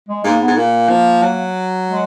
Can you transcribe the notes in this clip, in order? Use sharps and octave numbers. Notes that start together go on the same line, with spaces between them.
G#3
G#2 A#3
B3
G#2
A#2 A#3
F3
F#3
G#3